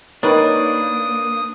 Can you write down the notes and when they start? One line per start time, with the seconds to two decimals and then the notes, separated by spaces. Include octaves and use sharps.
0.23 D#3 A#3 D4 D#4 A#4 B4 C#5 D#6